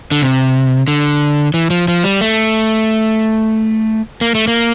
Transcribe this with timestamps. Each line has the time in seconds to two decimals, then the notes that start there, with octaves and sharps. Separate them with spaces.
0.11 D3
0.22 C3
0.88 D3
1.54 E3
1.70 F3
1.88 F3
2.04 G3
2.21 A3
4.21 A#3
4.35 A3
4.48 A#3